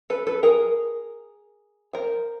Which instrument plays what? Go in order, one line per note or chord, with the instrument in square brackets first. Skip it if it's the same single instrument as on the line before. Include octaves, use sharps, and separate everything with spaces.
[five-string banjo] A4 B4
A4 B4
G#4 A#4
A#4 C5